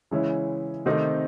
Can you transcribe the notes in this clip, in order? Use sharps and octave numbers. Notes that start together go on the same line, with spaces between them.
C#3 E3 G#3 C#4 E4
C3 D#3 A3 C4 D#4